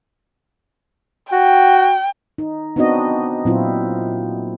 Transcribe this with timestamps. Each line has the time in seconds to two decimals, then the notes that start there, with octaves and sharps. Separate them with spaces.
1.33 F#4 G5
2.38 D#4
2.76 B3 C4 D4 D#4 F#4 D#5
3.45 A#2 F#3 C4 E4 F4